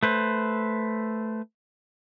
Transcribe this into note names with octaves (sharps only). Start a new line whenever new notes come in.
A3 B4 C5